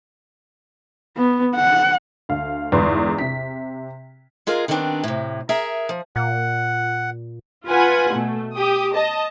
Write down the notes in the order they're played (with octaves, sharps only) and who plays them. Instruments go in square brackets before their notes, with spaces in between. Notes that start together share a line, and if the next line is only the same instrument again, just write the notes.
[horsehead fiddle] B3
F#5
[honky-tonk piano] D2 F5
G1 E2 G#2 B4 C6
C3 B6
[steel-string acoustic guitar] G#3 F4 G#4 A#4 F5
D3 D#3 G3 B3 C4 D4
A2 C3
G#4 A#4 E5 A#5
F3
[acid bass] A#2 [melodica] F#5
[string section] F4 B4 F#5 G#5
B2 A3
G4 D#6
D#5 A5